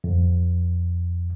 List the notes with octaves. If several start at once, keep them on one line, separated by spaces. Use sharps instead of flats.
F2